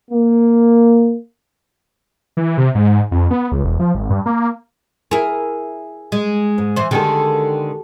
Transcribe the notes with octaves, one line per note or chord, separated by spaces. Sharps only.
A#3
E3
C3
G#2
F2
B3
C#2
E1
F3
G#1
G2
A#3
E4 G#4 A#4
G#3
G#2
E3 C5
D3 D#3 G#3 F#4 G4 A4